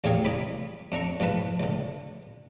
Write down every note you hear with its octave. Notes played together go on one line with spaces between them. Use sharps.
A1 E2 G4 G#4 C#5 F5
C2 D#4 D5 B5
F2 D4 A#5 C#6
B1 G#2 F3 B4 A5
C#2 D3